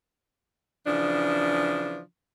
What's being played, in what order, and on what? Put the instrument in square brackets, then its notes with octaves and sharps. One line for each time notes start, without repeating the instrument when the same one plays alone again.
[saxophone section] C#3 E3 F3 D4